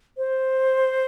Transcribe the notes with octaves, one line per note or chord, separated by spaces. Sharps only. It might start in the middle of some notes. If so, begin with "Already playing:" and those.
C5